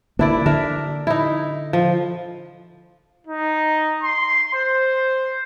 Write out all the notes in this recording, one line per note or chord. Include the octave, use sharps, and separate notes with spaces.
D3 A#3 D4 E4 D5
D3 D4 A#4 E5
D#4 E4
F3
D#4
C6
C5